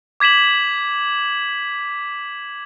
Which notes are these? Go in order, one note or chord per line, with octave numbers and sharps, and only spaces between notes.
D6 G#6 B6 E7 F#7